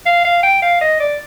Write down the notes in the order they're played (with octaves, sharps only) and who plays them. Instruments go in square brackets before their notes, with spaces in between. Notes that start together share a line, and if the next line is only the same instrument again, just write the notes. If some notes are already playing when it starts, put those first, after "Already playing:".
[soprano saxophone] F5
F5
G5
F5
D#5
D5